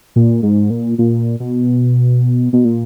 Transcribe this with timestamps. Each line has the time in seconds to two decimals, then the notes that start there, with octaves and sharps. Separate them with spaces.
0.16 A#2
0.43 G#2
0.70 A#2
0.98 A#2
1.40 B2
2.53 B2
2.65 A#2